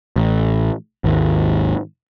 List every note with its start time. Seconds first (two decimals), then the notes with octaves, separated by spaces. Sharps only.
0.16 A1
1.04 G#1 D#2